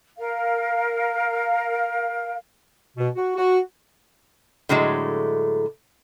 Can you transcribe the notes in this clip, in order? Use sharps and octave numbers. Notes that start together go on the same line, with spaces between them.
A#4 F5
B2
F#4
F#4
A2 D3 F#3 G#3 A3